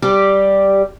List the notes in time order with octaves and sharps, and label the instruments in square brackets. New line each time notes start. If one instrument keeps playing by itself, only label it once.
[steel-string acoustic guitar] G3 G4 D5